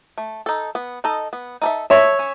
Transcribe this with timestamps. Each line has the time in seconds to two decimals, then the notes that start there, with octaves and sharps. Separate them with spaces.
0.18 A3
0.46 D#4 A4
0.75 B3
1.04 D#4 A4 D#5
1.33 B3
1.62 D#4 A4 E5
1.90 A3 C#5 E5
2.19 C#4